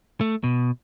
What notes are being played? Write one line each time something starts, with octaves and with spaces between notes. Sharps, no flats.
A3
B2